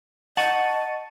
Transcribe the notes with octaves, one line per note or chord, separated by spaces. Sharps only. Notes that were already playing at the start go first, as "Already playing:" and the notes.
D#5 F#5 A5 C#6 D#7